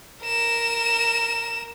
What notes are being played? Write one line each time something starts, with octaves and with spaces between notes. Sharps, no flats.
A#4 E7